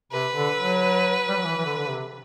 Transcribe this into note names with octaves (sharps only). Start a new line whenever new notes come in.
C3 B4
D3
F#3
G3
F#3
E3
E3
D3
D3
C3